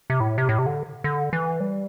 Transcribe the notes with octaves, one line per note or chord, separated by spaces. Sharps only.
C3
A2
C3
A2
C3
D3
D3
E3
G3